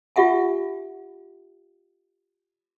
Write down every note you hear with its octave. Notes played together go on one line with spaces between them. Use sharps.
F4 G4 E5 F#5 G#5